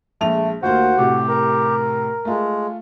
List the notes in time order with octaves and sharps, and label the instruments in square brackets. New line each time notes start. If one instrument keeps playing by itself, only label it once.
[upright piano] A#1 G#3 F7 [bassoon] A3
[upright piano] D#2 A3 A#3 [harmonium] F4 C5 [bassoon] F#4
[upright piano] A2 C3 A3 [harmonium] G4
[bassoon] A#4
[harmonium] G#3 [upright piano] A3 F4